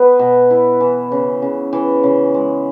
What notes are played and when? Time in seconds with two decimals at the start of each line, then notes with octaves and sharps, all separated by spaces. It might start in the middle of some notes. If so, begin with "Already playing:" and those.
Already playing: B3 B4
0.19 B2
0.50 E4
0.81 E3
1.12 C#3
1.42 C#3
1.73 E3
2.03 C#3
2.34 G#3